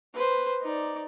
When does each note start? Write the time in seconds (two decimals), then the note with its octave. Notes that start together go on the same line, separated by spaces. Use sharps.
0.14 B4 C5
0.61 D#4 D5